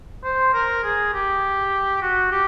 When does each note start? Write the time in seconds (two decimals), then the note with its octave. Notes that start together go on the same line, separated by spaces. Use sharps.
0.24 C5
0.54 A#4
0.84 G#4
1.13 G4
2.02 F#4
2.32 G4